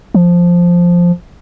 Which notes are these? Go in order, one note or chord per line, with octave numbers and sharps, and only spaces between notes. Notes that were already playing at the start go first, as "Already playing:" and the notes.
F3